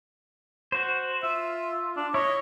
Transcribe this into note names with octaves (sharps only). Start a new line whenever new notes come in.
F#4 C5
F4 E5
D4
E4 C#5 D#5